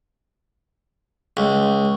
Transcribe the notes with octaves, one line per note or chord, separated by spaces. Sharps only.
C#2